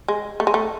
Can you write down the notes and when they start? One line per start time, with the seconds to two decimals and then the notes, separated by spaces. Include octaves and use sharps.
0.08 G#3
0.40 A3
0.47 G#3
0.54 A3